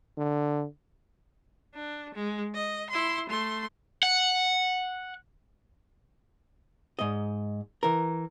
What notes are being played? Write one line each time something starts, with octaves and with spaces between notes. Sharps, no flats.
D3
D4
G#3
D#5
E4 C6
A3 C6
F#5
G#2 D#5
E3 A#4